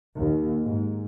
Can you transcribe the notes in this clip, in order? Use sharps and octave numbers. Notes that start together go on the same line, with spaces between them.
D#2
G#2